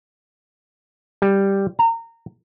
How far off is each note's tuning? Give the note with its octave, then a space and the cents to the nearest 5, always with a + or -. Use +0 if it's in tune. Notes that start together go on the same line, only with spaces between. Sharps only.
G3 +0
A#5 -25